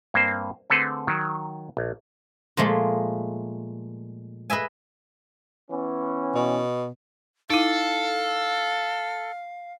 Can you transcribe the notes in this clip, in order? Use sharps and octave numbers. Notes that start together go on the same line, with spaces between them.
G2 A#3 C4 C5
D3 A3 C4 G#4 A4 B4
D#3 F#3
A#1
A#2 F3 G#3 A3
G#4 B4 D#5 E5 G#5
E3 B3 C#4
B2
D#4 E4 A4 F5